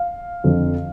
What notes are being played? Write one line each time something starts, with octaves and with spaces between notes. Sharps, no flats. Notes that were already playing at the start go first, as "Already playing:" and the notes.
Already playing: F5
F2 D3 F3